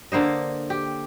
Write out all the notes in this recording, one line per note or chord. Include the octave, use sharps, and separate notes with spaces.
D3 A#3 C5 D#5
G4